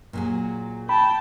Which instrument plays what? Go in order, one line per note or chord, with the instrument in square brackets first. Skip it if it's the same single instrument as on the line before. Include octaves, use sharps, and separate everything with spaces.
[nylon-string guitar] A#2 F#3 G#4
[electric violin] G5 A5 [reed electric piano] B5